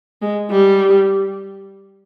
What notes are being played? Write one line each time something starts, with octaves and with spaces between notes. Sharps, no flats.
G#3
G3